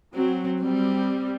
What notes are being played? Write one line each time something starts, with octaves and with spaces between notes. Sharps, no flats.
F#3 C4
G3 C4